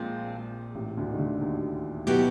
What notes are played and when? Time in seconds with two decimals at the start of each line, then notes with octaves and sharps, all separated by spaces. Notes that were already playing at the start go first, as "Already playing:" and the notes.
Already playing: A#1 A#2 F3 G#3 C4 F4
0.75 A1 A2
0.97 D2 D3
1.11 D#3
1.18 D2 D3
1.41 D#2 D#3
2.07 B2 F#3 B3 E4 G4